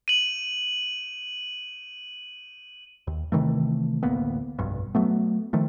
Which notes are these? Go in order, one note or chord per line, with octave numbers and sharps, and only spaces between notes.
D#7 F#7
D#2
C3 D#3 E3 A3
A1 D2 A#3 B3
F1 B1 G2
F#3 A3 B3
D#3 F3 A3